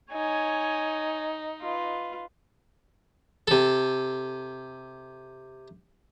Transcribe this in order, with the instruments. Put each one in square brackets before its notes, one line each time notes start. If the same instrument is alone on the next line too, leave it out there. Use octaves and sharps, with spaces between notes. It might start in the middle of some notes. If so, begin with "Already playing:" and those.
[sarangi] D#4 [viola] C#5 G#5
[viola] F4 B4
[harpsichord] C3 A4